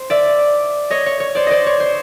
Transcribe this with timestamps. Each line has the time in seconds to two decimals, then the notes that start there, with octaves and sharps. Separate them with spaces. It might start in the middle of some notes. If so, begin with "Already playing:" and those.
Already playing: C5
0.10 D5 E5
0.90 C#5 D#5
1.06 C#5
1.20 C#5
1.35 C5 D5
1.47 C5 D5 D#5
1.66 C#5
1.80 C5